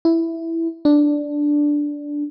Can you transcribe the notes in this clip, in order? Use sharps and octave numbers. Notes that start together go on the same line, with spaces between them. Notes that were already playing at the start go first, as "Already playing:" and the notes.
E4
D4